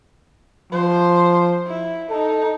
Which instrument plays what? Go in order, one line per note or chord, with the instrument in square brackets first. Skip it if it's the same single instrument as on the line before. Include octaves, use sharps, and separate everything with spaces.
[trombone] F3 [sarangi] C5
[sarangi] E4
[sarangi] D#4 [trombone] A4